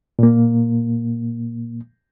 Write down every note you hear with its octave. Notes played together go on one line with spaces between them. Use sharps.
A#2 A#3